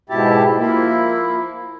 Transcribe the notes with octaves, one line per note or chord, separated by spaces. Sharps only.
G#2 B2 E4 G4 A5
F3 A#3 E4